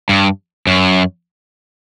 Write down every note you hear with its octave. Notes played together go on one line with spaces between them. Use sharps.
G2
F#2